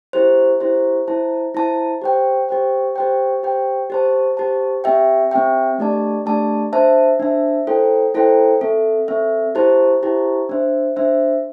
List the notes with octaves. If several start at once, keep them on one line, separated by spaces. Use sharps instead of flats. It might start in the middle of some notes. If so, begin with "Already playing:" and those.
E4 G4 C5
E4 G4 C5
E4 C5 A5
E4 C5 A5
G4 C5 G5
G4 C5 G5
G4 C5 G5
G4 C5 G5
G4 C5 A5
G4 C5 A5
C4 G4 E5 G5
C4 G4 E5 G5
A3 D4 G4 D5 A5
A3 D4 G4 D5 A5
D4 C5 E5 A5
D4 C5 E5 A5
E4 A4 C5 G5
E4 A4 C5 G5
C4 A4 E5
C4 A4 E5
E4 G4 C5 A5
E4 G4 C5 A5
D4 C5 E5
D4 C5 E5